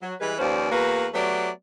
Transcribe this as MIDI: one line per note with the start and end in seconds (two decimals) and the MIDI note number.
0.02 0.14 54
0.20 0.35 52
0.20 0.35 55
0.20 0.35 56
0.20 0.35 71
0.39 0.69 39
0.39 0.69 53
0.39 0.69 61
0.39 0.69 71
0.39 0.69 72
0.39 0.69 74
0.72 1.08 40
0.72 1.08 58
0.72 1.08 66
0.72 1.08 71
1.14 1.50 54
1.14 1.50 57
1.14 1.50 59
1.14 1.50 67
1.14 1.50 73
1.14 1.50 74